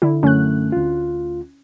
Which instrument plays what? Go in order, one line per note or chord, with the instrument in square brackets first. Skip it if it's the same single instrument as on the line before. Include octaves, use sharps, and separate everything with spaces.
[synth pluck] D3 E4
[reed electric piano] F#2 D3 A3 [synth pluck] C#4 F#6
[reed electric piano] D2 F4